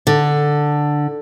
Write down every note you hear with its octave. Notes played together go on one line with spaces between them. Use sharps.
D3